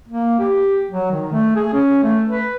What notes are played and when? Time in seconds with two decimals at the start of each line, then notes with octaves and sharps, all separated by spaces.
0.08 A#3
0.39 G4
0.91 F#3
1.11 D#3
1.33 A3
1.56 G#4
1.73 C#4
2.03 A3
2.29 B4